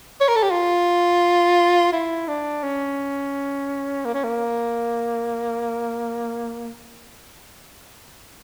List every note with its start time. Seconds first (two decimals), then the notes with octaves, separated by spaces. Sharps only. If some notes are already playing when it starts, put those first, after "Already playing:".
0.21 C#5
0.28 A#4
0.36 A4
0.43 G4
0.51 F4
1.92 E4
2.28 D4
2.63 C#4
4.05 A#3
4.14 C#4
4.24 A#3